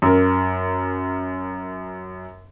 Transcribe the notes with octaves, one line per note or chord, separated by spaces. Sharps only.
F#2 A#4